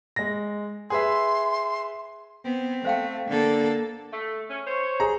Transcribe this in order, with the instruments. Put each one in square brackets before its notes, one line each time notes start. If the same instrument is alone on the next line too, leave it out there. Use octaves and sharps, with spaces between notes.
[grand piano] G#3 A#6
[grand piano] G#4 B4 E5 [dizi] C6
[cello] B3 [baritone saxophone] C4
[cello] A3 [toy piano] C5 F5 G5
[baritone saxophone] D3 [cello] A#3 A4
[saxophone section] A3
C#4
C5 C#5
[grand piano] G#4 A#5